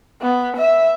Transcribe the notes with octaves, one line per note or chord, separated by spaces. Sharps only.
B3
E5